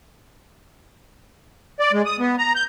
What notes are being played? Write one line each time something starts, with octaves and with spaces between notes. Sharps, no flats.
D5
G#3
D#6
B3
A#5
G6